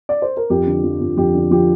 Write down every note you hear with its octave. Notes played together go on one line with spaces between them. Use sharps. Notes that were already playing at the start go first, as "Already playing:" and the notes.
D5
C5
A#4
F2 G4
D3
F3
F2
F2 G4
D3
F3 G4